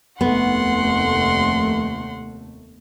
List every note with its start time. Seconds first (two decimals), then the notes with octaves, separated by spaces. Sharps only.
0.21 F1 D#2 A3 B3 F#5 C6